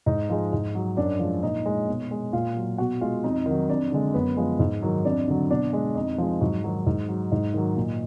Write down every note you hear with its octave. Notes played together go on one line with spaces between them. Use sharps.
G#2 D#4 D#5
F3 G#3
G#2
F#3
F#2 D4 D5
F3 G#3
A#2 D#4 D#5
G#3
B2
G#3
A#2 F4 F5
F#3
B2 F#4 F#5
G#3 F4 F5
F2 D#4 D#5
D#3 F#3
F2 D4 D5
D3 G#3
F#2 B3 B4
F3 G#3
G#2
D#3 F#3
F2 D4 D5
D3 F#3
B2 D4 D5
G#3
F2 D#4 D#5
F3 G#3
G#2 F#3 F#4
D#3 F#3
G#2
F#3
G#2 D#4
D#3 F#3
A#2